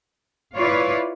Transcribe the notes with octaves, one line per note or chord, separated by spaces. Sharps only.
E4 F4 B4 C#5 D5 F5